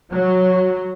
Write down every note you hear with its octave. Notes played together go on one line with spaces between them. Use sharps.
F#3